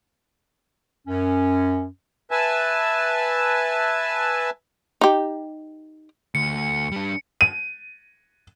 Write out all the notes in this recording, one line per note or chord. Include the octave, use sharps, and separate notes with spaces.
F#2 C#4
B4 E5 G#5 A5
D#4 G4
D2 C#7
G3 D4
D#7